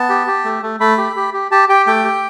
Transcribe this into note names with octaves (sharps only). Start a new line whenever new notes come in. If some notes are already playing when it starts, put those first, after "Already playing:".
Already playing: B3 A5
G4
G4
A3
A3
A3 B5
G4
G4
G4
G4 A5
G4 G5
A3 G5
G4